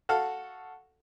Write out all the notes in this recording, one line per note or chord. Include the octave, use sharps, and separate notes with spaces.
F#4 A4 F5